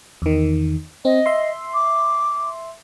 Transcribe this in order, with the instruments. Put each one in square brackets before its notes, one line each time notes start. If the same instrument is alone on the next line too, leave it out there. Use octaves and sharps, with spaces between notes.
[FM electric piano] E2 D#3
[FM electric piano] C4 [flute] D#5
[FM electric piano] E5 C6
[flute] D6